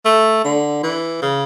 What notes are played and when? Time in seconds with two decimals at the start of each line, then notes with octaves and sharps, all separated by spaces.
0.05 A3
0.44 D3
0.83 E3
1.22 C#3